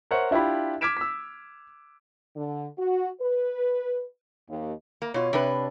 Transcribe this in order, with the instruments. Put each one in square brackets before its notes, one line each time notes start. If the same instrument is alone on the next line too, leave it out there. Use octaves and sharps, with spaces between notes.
[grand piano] A#4 C5 C#5 E5 F#5
D4 E4 F4 G4 B5
D6 F6 G#6 B6 D7 E7
E6 B6
[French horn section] D3
F#4
B4
D#2
[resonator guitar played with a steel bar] A#3
[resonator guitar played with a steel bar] B2 F4 [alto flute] C#5
[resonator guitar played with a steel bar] C3 D4 B4